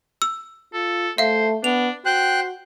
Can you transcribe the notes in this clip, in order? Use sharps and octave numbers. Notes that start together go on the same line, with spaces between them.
E6
F4 A4
A3 C5 E5 F5
B3 D4 F7
F#4 C5 G5 F#6